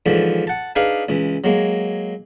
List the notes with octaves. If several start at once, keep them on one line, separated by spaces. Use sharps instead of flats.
G#2 D3 E3 F3
F#5 A5
D4 D#4 G#4 B4 F5 G#5
C#2 E3
F#3 G#3 A#3